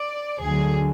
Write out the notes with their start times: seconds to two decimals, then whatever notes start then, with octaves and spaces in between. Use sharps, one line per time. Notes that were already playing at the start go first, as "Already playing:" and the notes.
Already playing: D5
0.40 D2 D3 F#3 G#4